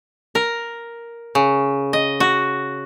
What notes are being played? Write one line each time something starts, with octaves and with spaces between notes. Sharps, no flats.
A#4
C#3
D#5
F#4